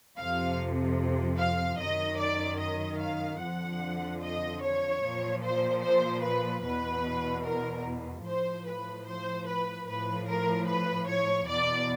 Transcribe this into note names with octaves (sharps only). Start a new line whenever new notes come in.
F2 C3 F3 F5
F5
F#2 D#3 D#5
D5
D#5
F5
F2 D3 F3 F#5
D#5
C#5
A#2 F3
C5
C5
B4
E2 B2 B4
A#4
A2 F3 C5
B4
C5
B4
A2 F3 B4
A#4
B4
C#5
E2 B2 D5